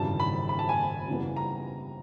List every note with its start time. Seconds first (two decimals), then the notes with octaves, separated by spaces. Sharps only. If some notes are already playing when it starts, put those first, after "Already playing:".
Already playing: G#1 F#2 C#3 E3 G3 A5
0.20 B5
0.49 B5
0.59 A5
0.69 G#5
1.08 F#2 C#3 E3 G3 B3
1.36 A#5